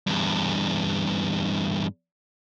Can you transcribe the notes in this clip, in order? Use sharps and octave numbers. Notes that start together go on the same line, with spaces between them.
E2 G2